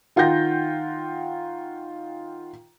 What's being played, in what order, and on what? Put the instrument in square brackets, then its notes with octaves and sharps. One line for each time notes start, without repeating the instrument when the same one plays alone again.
[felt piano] D#3 F4 F#5 G5 G6 A#6